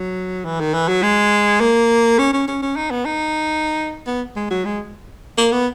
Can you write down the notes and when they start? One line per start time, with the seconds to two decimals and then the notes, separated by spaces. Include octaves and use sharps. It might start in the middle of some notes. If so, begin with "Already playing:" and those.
Already playing: F#3
0.45 E3
0.60 D#3
0.74 E3
0.88 F#3
1.02 G#3
1.60 A#3
2.19 C#4
2.33 C#4
2.48 C#4
2.62 C#4
2.76 D#4
2.91 B3
3.05 D#4
4.07 B3
4.36 G#3
4.50 F#3
4.65 G#3
5.38 A#3
5.52 B3